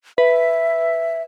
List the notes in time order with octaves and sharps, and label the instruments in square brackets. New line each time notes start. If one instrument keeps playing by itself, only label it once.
[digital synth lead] B4 [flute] E5